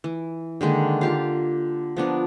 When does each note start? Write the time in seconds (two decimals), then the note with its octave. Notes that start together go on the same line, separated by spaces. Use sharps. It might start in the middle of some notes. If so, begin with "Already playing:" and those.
0.04 E3
0.61 D3 D#3 G#3 A#3
1.01 F4 G4 F5
1.97 F3 B3 D4 A#4